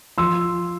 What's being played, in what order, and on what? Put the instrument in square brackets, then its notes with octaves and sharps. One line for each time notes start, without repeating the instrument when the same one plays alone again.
[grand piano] F3 C6 E6